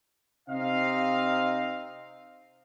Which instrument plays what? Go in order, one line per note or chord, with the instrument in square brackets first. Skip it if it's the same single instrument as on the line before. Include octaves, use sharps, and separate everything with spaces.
[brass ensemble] C3 C4 D#4 D#5 F5